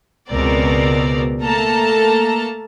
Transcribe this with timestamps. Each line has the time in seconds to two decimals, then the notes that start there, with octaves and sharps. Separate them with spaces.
0.28 C#2 B2 C4 A#4 D5
1.41 A3 A#3 A4 A5 A#5